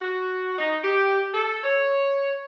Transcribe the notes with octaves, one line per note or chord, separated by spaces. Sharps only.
F#4
D#4
G4
A4
C#5